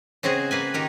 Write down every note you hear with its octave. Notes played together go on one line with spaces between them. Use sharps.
C#3 C4 F#4 G#4 D#5
A#3 B4 G#5
D#3 G4 A#4